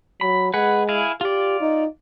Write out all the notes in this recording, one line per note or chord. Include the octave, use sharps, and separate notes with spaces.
F#3 B5
G#3 G#4 B4 F#5
E4 G#4 F5
F4 G4 D5
D#4